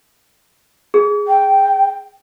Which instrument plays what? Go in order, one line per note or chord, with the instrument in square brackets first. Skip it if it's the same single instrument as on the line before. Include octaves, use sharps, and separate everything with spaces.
[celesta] G#4
[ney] G5